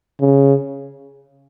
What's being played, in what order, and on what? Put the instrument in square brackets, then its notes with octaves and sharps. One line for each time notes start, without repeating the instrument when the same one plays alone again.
[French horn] C#3